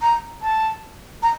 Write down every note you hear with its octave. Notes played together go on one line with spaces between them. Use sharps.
A#5
A5
A#5